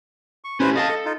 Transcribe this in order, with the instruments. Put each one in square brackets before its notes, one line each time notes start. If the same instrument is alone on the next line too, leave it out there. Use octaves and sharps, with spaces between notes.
[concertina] C#6
[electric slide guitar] C#4 E4 G4 [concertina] B4 C5
[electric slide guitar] A4 F5 A5 [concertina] D#5
[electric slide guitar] A4
[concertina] D#4 F4